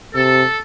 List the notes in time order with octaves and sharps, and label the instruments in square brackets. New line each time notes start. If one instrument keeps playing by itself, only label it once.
[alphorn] C3 [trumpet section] A4